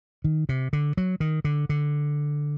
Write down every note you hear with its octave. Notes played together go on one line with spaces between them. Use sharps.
D#3
C3
D3
F#3
D#3
D3
D3